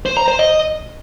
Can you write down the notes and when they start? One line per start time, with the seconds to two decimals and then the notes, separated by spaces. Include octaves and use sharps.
0.06 C5
0.17 A#5
0.28 C5
0.39 D#5